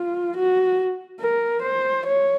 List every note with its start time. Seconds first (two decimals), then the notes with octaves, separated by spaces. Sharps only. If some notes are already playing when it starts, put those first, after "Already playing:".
Already playing: F4
0.37 F#4
1.20 A#4
1.63 C5
2.06 C#5